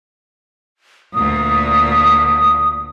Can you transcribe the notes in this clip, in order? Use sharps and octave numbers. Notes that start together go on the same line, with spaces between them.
D2 A#2 D#6